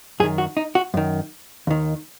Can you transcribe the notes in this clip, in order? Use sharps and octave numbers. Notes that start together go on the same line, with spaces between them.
F#2 D#3 G#4
F#4
D#4
F#4
F#2 D#3
D#2 D#3